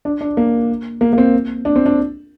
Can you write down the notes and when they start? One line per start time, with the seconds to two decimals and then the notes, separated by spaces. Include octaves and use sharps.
0.05 D4
0.21 D4
0.37 A#3
1.01 A#3
1.13 A#3
1.18 C4
1.65 D4
1.76 C4
1.86 D4